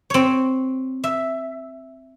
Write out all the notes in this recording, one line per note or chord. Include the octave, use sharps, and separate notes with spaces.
C4 C#5
E5